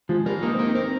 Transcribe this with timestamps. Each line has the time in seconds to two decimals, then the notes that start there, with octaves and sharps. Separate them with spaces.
0.09 F3 G#3
0.26 G3 A#4
0.43 A#3 D#4
0.54 C4
0.59 A#3 A#4
0.75 C4 A#4